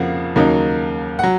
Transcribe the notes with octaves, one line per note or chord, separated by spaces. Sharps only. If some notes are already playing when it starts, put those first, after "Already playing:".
Already playing: F2 C#3 F3 A#3 F5 F#5
D#2 C#3 F#3 A#3 D#4
F#3 F#5